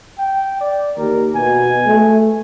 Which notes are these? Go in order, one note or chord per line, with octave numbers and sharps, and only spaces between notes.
G5
D5
D#2 A#4
B2 G#5
A3